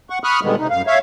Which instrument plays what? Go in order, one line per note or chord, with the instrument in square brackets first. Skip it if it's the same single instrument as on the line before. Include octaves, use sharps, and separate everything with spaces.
[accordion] F#5 C#6
B5 C#6 D#6 F6 F#6
A#2 D3 D#3 G3 G#3 B3
D2 C3 D#4
F#2 F5
C#5 E5 F5